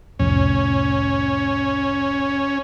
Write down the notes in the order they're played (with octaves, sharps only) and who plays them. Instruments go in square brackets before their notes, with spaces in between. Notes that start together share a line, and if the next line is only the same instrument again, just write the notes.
[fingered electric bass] C2 F2 A2 [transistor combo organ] C#4